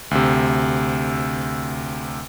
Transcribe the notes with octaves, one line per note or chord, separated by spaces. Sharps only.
D2 C3